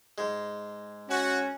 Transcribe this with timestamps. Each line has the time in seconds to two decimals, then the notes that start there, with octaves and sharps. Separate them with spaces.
0.18 G#2 G#3
1.09 C#4 F#4